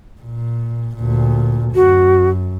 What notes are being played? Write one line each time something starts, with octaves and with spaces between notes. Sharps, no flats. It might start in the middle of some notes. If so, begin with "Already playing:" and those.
A#2
D2 A#2
F#2 F#4